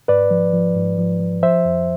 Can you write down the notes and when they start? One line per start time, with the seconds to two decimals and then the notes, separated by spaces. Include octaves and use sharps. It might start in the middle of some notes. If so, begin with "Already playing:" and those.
0.08 G#2 B4 D5
0.31 F3
0.53 F3
0.75 G#2
0.98 F3
1.20 F3
1.42 F3 C5 E5
1.65 F2